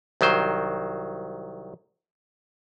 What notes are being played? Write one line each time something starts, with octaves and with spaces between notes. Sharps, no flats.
C2 D#3 F#3 C5